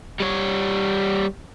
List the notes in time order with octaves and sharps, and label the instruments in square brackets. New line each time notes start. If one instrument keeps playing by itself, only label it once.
[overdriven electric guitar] G3 C#5